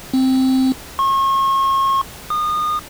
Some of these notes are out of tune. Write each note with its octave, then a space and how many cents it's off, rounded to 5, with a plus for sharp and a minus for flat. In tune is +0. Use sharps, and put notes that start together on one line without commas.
C4 +0
C#6 -40
D#6 -30